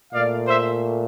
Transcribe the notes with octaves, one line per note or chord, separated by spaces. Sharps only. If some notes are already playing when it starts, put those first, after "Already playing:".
A#2 A3 D5 F5
C5 E5